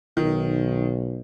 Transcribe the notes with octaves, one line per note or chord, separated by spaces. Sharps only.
B1 D#3